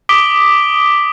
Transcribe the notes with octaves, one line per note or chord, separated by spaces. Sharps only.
D6 D#6 B6 D7 G7